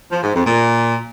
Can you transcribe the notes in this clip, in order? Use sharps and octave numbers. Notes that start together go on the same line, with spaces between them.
F3
G#2
F2
A#2